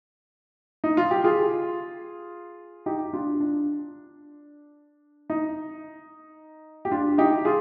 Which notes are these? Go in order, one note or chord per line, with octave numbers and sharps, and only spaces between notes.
D#4
F4
G4
F4 G#4
D#4 G4
D4 F4
D4
D#4
G4
D4 F4
D#4 G4
F4 G#4